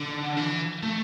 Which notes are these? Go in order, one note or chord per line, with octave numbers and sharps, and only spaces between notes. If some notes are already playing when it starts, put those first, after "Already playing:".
Already playing: D3
E3
A3